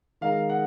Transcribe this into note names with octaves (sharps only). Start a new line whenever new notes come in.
D#3 G#3 D#4 A#4 F5
F#5